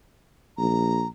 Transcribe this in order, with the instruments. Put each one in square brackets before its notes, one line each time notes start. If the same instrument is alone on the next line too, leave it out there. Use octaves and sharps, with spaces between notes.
[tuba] A#1 [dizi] A#5